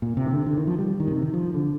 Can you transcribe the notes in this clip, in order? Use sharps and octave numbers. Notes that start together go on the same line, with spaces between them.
A#2
C3
D#3
D3
D3
D#3
F3
G3
D#3
A#2
C3
D#3
F3
D3